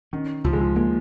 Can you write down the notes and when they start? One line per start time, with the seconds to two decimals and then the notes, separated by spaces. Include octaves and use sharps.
0.13 D#3 C#4
0.44 C#2 F3
0.53 G#3
0.61 F3
0.76 G#3 A#3